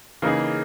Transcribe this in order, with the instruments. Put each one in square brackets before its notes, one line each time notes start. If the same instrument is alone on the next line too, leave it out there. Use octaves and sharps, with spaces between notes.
[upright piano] C#3 [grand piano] E3 A#3 D#4 G#4